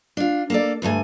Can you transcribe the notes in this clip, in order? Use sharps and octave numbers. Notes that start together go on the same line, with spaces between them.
D4 F4
A#3 A4 D5
D2 G2 A3 G#5